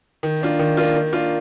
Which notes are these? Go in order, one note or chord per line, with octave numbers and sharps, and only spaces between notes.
D#3
A#3 D4 F4
D#3
A#3 D4 F4
D#3
A#3 D4 F4